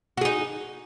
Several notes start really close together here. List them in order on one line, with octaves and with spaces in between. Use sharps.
F#4 G#4 D#4